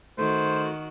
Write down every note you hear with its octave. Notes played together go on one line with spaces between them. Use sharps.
D#3 A3 F#4 C5